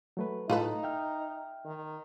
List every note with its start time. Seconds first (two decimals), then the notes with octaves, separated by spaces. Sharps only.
0.17 F#3 A3 B4
0.50 A2 D#4 F4 A4 B4
0.83 E5 G5 F6
1.65 D#3